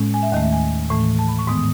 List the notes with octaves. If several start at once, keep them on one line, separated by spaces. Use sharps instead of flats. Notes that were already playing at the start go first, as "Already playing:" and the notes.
Already playing: A2 G#3 C#4
G#5
E5
D#2 D#3 A3 D#5
E5
G#5
A2 E3 A3
A5
B5
C#6
G#2 D#3 G#3 B3 D#6
D#6